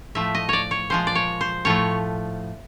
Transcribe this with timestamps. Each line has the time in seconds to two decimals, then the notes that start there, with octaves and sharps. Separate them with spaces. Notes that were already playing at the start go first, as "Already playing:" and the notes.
0.15 A2 F3 A3 E5
0.35 D#5
0.49 C#5 D5
0.71 C#5
0.90 A#2 F3 G#3 C5
1.07 D5
1.15 C#5
1.41 C5
1.65 A2 F3 A3 C#5